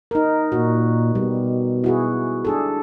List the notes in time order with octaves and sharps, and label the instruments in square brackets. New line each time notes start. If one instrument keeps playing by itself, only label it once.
[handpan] D#4 A#4
[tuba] A#2 [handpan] F#4
[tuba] B2 [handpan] G3
[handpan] E4 F#4 G#4
D4 G#4 A4